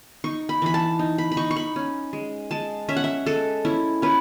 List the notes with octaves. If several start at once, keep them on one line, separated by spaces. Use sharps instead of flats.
D#4 C#6
B5
E3 B5
A5
D#4
B5
B5
D#4 C#6
C#6
B5
C#4
G#3
G#3 A5
C#4 E5
F#5
E5
G#3 A4
C#4 E4
C#4 B4